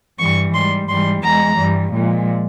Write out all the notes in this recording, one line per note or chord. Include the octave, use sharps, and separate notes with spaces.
G2 E3 G3 C#6
G#2 G3 C6
G#2 E3 G3 C6
E2 E3 G#3 A#5
G2 E3 G3
A#2 F3 G#3